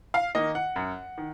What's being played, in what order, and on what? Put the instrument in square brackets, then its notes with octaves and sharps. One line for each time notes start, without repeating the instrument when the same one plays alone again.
[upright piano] F5
D#3 A#3 D#5
F#5
F#2
D#3